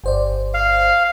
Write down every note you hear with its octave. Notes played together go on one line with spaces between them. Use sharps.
G1 C5 D5
F5